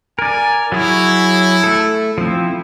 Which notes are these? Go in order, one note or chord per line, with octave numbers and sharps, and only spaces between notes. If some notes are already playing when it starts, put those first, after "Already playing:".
A#4 D5 G#5
F#3 E4 G#4 C#5
A3 A4
F3 C4 E4